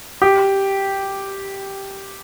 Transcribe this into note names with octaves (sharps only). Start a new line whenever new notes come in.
G4